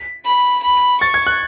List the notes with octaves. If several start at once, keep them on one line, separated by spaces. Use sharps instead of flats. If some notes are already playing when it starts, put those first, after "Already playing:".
Already playing: B6
B5
B5
C#6 A6
G#6
F#6